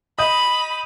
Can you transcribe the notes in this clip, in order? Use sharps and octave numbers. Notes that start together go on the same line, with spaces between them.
D#5 B5 D#6 G6 D#7